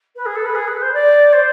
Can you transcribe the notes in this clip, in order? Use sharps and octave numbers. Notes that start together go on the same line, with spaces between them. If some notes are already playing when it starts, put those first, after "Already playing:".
B4
G#4
A4
B4
G#4
B4
C5
D5
C5